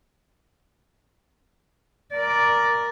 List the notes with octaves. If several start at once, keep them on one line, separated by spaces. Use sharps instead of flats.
A#4 D5